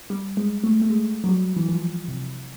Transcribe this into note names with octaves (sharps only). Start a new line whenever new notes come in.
G3
G#3
A3
A3
G#3
F#3
G3
E3
F3
C3